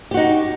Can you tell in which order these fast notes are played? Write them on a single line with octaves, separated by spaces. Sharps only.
G4 F#4 D#4